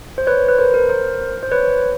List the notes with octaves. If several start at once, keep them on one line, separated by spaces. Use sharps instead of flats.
C5
B4 C#5
B4
A#4 C5
A#4
A#4 C5
C5
B4 C#5